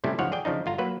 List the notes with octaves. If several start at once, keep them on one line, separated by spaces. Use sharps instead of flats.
A2 C3 G3 C#4 E4
C#2 G#2 F3 C#5 F#5
G#4 D5 G5
C#3 F3 D4 D#4
G1 F4 A#5
F#3 A#3 B4